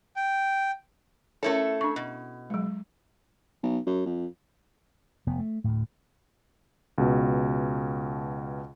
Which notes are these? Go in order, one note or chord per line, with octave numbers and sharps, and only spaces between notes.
G5
A3 C#4 E4 A4 A#4 C#5
D4 C#6
B2
F#3 G#3
B1
F#2
F2
F1 B3
A3
D2 A2
C#2 B2